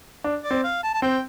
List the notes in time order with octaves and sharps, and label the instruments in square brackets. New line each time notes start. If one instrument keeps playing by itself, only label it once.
[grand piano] D4
[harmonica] D5
[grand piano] C4
[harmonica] F5
A5
A5
[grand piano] C4 [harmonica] G5